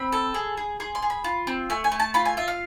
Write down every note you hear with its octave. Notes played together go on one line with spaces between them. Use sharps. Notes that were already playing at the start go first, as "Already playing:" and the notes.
Already playing: C4 B5
A4
G#4
G#4
G#4 C6
C6
G#4
B5
F4
C4
A3 G#5
G#5
A3
A5
F4 B5
G#5
F4 E5
F5